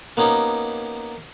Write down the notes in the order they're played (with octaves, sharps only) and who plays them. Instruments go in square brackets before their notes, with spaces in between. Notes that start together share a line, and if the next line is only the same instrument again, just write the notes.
[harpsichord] A#3 B3 C#4 D#4 G4